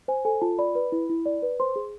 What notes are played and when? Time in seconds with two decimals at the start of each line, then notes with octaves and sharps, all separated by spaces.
0.08 C5 G#5
0.25 A4 G#5
0.42 F4 A5
0.59 D5 B5
0.75 B4
0.92 E4
1.10 E4
1.26 D5
1.42 B4
1.60 C5 C6
1.76 G#4